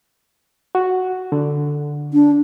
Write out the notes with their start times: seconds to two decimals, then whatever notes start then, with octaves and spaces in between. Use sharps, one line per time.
0.75 F#4
1.32 D3
2.13 D4